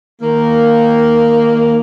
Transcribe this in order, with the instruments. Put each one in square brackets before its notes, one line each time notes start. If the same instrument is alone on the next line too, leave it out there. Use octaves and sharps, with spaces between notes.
[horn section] D#3 A#3